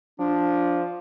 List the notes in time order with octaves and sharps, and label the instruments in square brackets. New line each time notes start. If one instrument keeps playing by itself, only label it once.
[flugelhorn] F3 [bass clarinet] D4